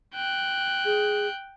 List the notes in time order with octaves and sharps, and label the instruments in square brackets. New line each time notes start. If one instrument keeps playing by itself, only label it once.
[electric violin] G5 F#6
[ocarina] G#4